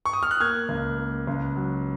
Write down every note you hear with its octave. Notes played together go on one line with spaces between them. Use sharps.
C#6
D#6
F6
F#6
A#3 F6 G#6
C#2
A#3
C#2
F#3